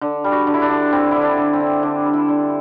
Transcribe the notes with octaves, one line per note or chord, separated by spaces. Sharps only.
D3
G3
F#4
D3
E4
D4
D3
G3 C4
D3 E4
D4
D3
C4
D3
D3 D4
G3
E4
D3